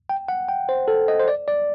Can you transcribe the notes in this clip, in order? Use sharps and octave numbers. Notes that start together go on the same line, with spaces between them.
G5
F#5
G5
C5
A4
D#5
C5
D5
D5